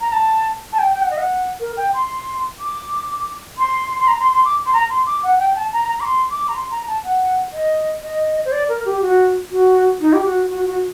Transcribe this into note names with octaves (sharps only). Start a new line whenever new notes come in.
A#5
A5
A5
G5
G5
F#5
D#5
F#5
A#4
G5
C6
D6
C6
C6
A#5
C6
C6
D6
C6
A#5
C6
D6
F#5
G5
A5
A#5
A#5
D6
C6
D6
A#5
C6
A#5
A5
F#5
D#5
D#5
C5
D5
A#4
G4
F#4
F#4
D#4
G4
F#4
F#4
F#4